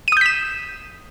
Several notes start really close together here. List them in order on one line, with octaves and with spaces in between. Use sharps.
D#7 D#6 G6 B6 E7